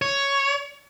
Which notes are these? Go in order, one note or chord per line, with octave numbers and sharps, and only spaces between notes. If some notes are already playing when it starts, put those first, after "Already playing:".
C#5